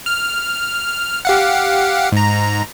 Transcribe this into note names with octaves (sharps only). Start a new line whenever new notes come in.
F6
G4 F5 F#5
G#2 A#5